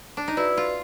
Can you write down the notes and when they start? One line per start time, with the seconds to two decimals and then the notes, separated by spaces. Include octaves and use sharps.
0.17 D4
0.28 D#4
0.37 E4 F#4 B4 D5
0.57 F4